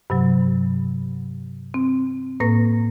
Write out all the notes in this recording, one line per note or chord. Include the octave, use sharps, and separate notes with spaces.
G2 C3 F#3
C4
A2 A#3 B4 A#6